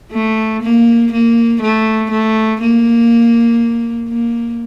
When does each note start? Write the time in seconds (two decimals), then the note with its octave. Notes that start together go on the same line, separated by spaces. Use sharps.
0.12 A3
0.62 A#3
1.12 A#3
1.62 A3
2.11 A3
2.61 A#3
4.09 A#3